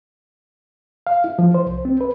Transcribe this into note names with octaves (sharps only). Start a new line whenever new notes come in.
F5
E4
F3
C5
C2
C4
B4